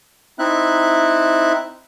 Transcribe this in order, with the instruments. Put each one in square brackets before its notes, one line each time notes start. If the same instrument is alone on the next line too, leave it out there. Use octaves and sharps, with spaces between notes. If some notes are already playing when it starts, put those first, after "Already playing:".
[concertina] C4 D#4 E4 E5 F#6